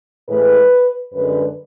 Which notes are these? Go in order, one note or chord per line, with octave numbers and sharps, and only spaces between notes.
A2 E3 G#3 B4
F#2 D3 G#3 B4